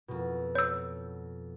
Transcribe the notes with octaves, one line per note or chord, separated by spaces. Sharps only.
F2 B2
C#5 E6